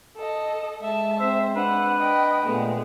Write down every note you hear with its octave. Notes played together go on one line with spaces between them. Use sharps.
A4 D#5
G#3 E5 A5
C4 C5 E5
D4 B4 F#5
D#5 G5
A#2 G#3 A3 B3